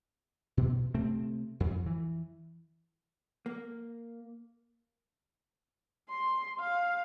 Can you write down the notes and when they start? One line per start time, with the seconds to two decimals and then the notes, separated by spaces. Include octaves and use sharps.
0.57 B2
0.94 C3 A3 C4
1.60 F2
1.86 E3
3.46 A#3
6.10 C6
6.60 F5